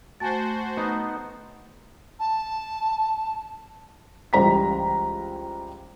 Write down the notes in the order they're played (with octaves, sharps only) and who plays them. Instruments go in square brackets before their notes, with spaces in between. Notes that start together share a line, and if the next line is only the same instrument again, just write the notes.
[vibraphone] A3 [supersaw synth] F#4 C5 [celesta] G#5 A5 A6
[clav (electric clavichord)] B3 D#4
[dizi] A5
[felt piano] C#2 E3 G3 C5 A#5 B6